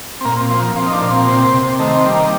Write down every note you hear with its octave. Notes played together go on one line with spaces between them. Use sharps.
C4
A#2 A#3
C4
F3 C4
A#3
F3 C4
D#4
D4
A#2
C4
C3
C3
D#3 A3
C4
G3
A#3